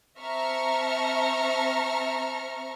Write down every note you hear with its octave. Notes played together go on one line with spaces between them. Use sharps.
C4 E5 A5 A#5 C#6 F6